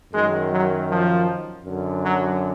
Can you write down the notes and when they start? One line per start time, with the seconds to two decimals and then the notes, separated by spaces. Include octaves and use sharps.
0.13 F#2 D#3 G#3
0.52 F#3
0.89 F3
1.65 F#2 D3
2.02 F#3